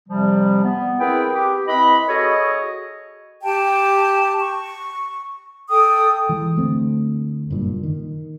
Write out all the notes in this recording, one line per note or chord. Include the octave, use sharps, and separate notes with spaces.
F2 C3 F3 G3
B3
C4 E4 G#4 A#4 B4 G5
G4
C4 E4 B4 D#5 B5
F#4 G#4 A4 C#5 D#5
G4 G5 A5
C#6
A4 G5 D#6
E3 G#3
D2 A3 C4
F#1 G2 A#2
D#3